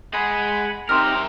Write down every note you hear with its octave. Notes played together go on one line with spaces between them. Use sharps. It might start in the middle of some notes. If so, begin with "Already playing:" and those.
G#3 G#4 F#5 G#5 B5
C4 D#4 G4 A#4 E5 C6 F6